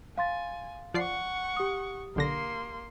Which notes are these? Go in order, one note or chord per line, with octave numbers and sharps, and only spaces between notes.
F5 G#5 C6 A6
F3 D5 F#5 C#6 C7
G4 D#6
B1 D3 A#3 C6 A#6